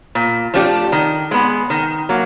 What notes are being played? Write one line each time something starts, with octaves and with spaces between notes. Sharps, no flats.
A#2
F3 A3 D4 G4
D#3
G#3 B3
D#3
F#3 A#3